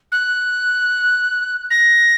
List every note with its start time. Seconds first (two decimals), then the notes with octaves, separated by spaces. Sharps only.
0.12 F#6
1.70 A#6